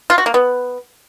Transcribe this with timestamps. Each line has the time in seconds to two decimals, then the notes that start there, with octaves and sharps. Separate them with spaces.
0.10 F4
0.18 F#4
0.26 A#3
0.34 B3